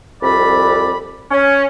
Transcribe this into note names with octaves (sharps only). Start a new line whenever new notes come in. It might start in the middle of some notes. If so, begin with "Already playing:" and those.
C2 F2 D5 B5
C#4